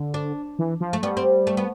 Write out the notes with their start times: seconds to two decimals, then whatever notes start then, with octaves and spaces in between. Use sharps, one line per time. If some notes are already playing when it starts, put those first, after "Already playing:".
Already playing: D3
0.14 D4
0.59 E3
0.80 F3
0.93 A3
1.02 G3 B3
1.17 C4
1.47 A3
1.57 B3